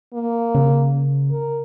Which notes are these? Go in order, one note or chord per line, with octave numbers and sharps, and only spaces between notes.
A#3
C#3
A#4